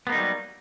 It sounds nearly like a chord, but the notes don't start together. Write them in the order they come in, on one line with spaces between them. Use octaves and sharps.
B3 A#3 D#4 G3 F#3